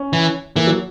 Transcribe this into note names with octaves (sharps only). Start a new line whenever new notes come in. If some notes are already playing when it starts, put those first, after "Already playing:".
Already playing: C#4
E3
E3 A#3
F#3